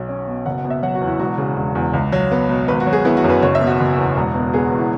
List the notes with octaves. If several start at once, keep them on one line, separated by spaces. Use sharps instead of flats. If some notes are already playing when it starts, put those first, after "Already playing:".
Already playing: B1 F#3
C#4
B2
F#1 F#5
F#5
B2
E5
F#3 F#5
F#4
E2
E4
E1 F#4
C#3
E1
E2
C#2
F#3
B3
B2
G#1 B4
F#4
F#3
G#4
B3 E4
F#4
F#2
B4
F#1 C#5
E5
B2
F#4
F#1
E2
E1
B2
B3 G#4
F#4
E2
E4